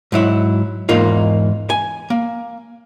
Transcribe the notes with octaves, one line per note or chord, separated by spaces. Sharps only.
G#2 F#3 E4
E2 G#2 A#3 D#4 F4
G#5
A#3